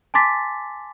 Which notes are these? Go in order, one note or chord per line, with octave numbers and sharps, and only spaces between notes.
G#5 A5 C6 D6 A6 B6